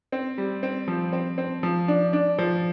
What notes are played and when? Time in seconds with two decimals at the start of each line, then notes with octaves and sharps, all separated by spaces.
0.12 C4
0.38 G3
0.63 C4
0.88 F3
1.13 C4
1.38 C4
1.63 F3
1.88 D4
2.13 D4
2.39 F3